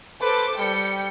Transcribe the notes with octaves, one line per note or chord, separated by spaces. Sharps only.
A4 B4 C5 D6
G3 G5 C#7